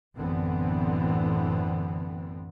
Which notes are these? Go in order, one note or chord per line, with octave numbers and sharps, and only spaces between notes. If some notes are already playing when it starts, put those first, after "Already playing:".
A1 F#2 D3 E3 B3 C4